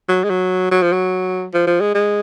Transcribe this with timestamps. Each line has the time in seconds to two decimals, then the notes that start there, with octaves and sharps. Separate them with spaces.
0.08 F#3
0.24 G#3
0.30 F#3
0.71 F#3
0.82 F3
0.92 F#3
1.54 F3
1.67 F3
1.81 G#3
1.94 G#3